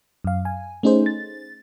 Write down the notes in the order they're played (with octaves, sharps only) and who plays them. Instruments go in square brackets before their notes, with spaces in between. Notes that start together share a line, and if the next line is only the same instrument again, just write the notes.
[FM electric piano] F#2 F5
G#5
A3 C#4 D#4 G#4 C5
A6